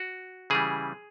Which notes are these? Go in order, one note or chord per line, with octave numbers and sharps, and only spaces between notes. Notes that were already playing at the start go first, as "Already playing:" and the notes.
Already playing: F#4
C#3 E3 G3 G#4